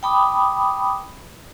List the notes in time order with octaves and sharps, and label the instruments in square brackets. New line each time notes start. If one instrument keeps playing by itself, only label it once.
[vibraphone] G5 A5 B5 D6 D#6